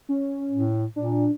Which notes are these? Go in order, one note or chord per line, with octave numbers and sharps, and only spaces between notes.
C#4
A2
A#2 D4